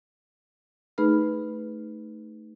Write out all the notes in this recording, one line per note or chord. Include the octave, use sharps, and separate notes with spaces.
A3 D#4 G#4 B4 B5 F6